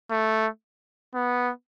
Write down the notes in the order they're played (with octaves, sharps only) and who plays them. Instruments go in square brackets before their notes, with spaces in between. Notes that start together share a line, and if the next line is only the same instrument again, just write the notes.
[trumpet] A3
B3